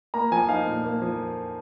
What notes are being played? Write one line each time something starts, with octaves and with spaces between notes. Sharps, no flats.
A#3 A#5
F3 G#5
D#4 F5
A#2
A#3
F3